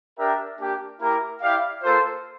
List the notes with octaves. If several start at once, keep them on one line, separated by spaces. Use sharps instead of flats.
D4 G4 A#4 E5 G5
A#3 D4 G4
A#3 E4 G4 A#4
E4 G4 D5 F5
A#3 F4 A4 C5